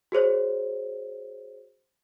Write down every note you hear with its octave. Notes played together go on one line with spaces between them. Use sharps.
F#4 G#4 C5 C#5